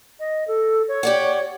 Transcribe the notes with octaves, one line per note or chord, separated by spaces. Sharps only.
D#5
A4
C#5
G4 D5 F#5